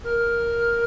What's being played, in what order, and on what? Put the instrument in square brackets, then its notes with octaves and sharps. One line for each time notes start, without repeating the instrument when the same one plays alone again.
[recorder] A#4